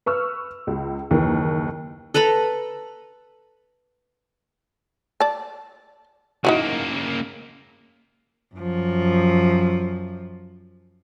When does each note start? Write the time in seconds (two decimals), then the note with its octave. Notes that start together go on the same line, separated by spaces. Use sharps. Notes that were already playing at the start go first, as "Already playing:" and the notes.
0.06 B4 C#6 E6 F6
0.67 C#2
1.10 F#1 D#2 E3 A#4
2.14 A4 B4 A#5 B5
5.20 D5 A5
6.45 C#3 A#3 D#4 E4 F#4
8.55 F#2 F3